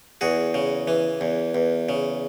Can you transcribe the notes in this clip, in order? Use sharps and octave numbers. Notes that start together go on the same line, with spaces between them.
E2 F#4 G#4
C#3
E3
E2
E2
C#3